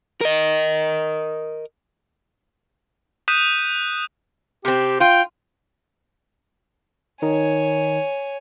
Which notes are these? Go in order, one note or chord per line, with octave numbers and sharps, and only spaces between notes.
A#4 D#5
D#6 F#6 G6 B6 D#7 E7
C3 C4 G4
F4 G5
D#3 D#4 C#5 G#5